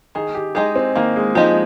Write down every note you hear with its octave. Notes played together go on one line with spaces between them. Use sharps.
D#3 G#4
G4
G#3 D#4 G4 G#4
C4
D#3 A#3
G#3
F3 G#3 D#4 G4